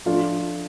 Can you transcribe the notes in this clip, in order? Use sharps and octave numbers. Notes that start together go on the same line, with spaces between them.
F3 A3 D4 F4